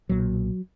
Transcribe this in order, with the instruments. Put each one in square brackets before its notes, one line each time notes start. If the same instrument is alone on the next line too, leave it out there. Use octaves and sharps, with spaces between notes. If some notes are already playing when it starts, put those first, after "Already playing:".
[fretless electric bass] B1 A#2 F#3